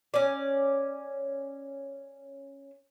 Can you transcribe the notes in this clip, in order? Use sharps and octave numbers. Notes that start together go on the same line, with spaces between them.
C#4 D5